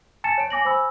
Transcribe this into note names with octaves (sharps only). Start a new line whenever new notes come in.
G#5 A5 A6 C#7 E7
C#5 D7
G#5 D6 A#6 F#7
C5 G#5 B5 E6